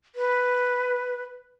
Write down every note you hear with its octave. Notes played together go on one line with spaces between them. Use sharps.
B4